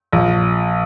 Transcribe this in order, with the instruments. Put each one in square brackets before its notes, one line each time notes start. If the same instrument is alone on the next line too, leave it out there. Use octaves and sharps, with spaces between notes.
[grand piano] A#1